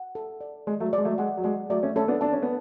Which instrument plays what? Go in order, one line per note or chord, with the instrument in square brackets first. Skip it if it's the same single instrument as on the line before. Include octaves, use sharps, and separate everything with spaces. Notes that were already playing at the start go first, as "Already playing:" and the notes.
Already playing: [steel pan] F#5
A4
D5
[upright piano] G#3 [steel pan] D5
[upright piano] F#3 A3
[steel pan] D5
[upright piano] G#3
F#3 A3
[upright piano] G#3 [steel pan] F#5
[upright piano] F#3
[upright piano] G#3 [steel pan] D5
[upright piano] F#3 A3 [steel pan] D5
[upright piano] A3 C#4
[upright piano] A3 C#4 [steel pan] A4
[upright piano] B3 D4
[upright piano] D4 [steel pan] A5
[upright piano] C#4
B3